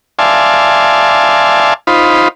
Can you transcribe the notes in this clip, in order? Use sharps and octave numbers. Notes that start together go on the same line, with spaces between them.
D5 E5 F5 G#5 A5 C6
D#4 F4 C5 B5